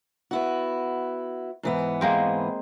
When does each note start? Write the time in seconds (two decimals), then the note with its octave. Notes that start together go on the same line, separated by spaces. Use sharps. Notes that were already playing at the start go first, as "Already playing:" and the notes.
0.31 B3 E4 F#4
1.63 G#2 E3 B3
2.01 G#3 A#3 C4